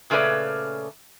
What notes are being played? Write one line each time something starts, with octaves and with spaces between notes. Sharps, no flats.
A#2 C#3 A3 C#4 B4 D5